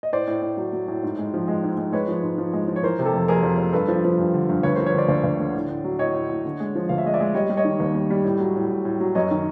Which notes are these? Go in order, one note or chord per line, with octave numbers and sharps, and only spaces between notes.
D#5
A2 C5 D5
A2
A2
F#3
F#3
A2
G#2
G#3
F3
G#3
G#2
G#3
G#3 B4 C#5
F3
G#2
F3
G#3
F3
C#5
E3 A#4 C5
C3
G4 A4
F2
F2 G#4 A#4
F2
F2
G2 A4 B4
F3
F3
G2
D3
G2
D2 B4 C#5
F3 A#4 C5
B4 C#5
D3 C5 D5
D2 C5 D5
D2
D3
A2
A2
F#3
A2 C#5 D#5
A2
A2
D3
G#3
F3
D2 F5
E5
G#3 D#5
D5 E5
G#3
G3 C#5 D#5
G3
C#5 D#5
D#3
D#2
G3
G3
A2
F#3
A2
A2
A2
F#3
F#2 C#5 D#5
D#3